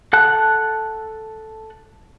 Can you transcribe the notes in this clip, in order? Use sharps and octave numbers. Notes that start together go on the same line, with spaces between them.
A4 F#5 A5 F#6